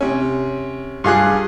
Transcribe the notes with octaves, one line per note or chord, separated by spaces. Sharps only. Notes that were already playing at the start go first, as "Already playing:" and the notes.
C3 C#4
G2 F4 G#4 F#6